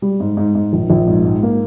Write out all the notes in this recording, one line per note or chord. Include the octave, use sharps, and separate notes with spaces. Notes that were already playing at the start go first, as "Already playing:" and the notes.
G3
G#2
G#2
G#2
A#1
A#1
G#2
G#2
A#3